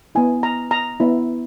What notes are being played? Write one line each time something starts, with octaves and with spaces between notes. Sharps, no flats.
B3 E4 G#5
A#5
A#5
B3 E4